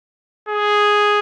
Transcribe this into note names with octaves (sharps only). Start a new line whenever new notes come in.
G#4